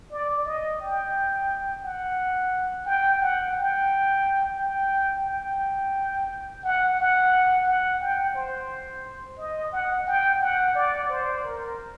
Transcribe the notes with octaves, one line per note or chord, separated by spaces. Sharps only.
D5
D#5
G5
F#5
G5
F#5
G5
G5
G5
F#5
F#5
F#5
G5
C5
D#5
F#5
G5
F#5
D5
C5
A#4